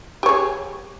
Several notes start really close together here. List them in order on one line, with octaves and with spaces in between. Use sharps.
G4 C#5 G#4